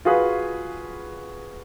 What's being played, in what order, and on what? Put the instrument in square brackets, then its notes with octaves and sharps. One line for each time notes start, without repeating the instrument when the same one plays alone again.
[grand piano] F4 F#4 G#4 B4